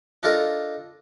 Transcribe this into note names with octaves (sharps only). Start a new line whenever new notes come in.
D4 D#4 F4 A4 A#4